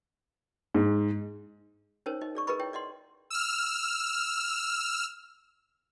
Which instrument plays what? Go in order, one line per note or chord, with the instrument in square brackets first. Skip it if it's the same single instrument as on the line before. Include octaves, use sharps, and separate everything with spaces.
[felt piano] G#2
[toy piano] C#4 D#4 A#4 C5 C#5
D#4 D#5
G#4 D5 C#6
G#4 A#4 B4 D#5 B5 C#6
E4 C#5 G5
D5 D#5 F#5 C6
[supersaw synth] E6 F6